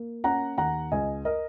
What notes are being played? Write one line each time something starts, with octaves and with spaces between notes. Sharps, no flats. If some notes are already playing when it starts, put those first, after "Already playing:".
Already playing: A#3
C#4 F#5 A#5
D#2 F#5 A#5
C#2 D#5 G#5
A#4 D#5